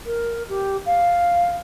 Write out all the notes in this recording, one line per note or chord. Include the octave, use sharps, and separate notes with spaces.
A#4
G4
F5